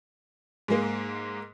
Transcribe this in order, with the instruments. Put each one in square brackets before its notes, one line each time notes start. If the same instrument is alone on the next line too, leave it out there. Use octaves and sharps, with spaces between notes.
[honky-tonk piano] G#2 G#3 A#3